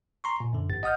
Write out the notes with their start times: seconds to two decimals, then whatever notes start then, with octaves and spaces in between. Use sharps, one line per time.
0.24 A#5 C6 C#6
0.40 A#2
0.53 F#2 D3
0.69 A1 G#2 A6
0.83 D#5 F#5 D#6 F6 G6